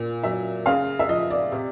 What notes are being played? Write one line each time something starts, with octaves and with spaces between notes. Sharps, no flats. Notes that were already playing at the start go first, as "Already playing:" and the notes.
Already playing: A#2
F#3 E5
C#3 F5
E5
F3 D#5
D5
C3